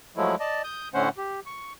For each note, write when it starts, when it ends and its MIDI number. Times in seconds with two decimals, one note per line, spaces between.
0.17 0.36 53
0.17 0.36 54
0.17 0.36 56
0.17 0.36 57
0.17 0.36 64
0.40 0.62 74
0.40 0.62 75
0.40 0.62 81
0.64 0.88 87
0.64 0.88 91
0.94 1.09 45
0.94 1.09 50
0.94 1.09 57
0.94 1.09 61
0.94 1.09 72
0.94 1.09 78
1.17 1.40 67
1.46 1.73 85